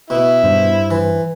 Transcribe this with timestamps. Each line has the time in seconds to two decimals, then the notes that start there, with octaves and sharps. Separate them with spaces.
0.10 B2 E4 E5
0.43 G2 C5
0.91 E3